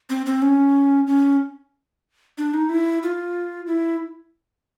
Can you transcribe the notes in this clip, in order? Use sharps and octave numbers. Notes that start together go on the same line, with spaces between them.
C4
C4
C#4
C#4
D4
D#4
E4
F4
E4